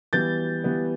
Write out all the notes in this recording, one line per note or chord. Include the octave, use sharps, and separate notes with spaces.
E3 G3 B3 G6 A6
E3 G3 B3